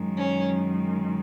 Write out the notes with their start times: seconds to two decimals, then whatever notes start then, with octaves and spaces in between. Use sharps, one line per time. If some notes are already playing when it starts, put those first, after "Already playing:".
Already playing: F#2 D#3 G#3
0.17 C#4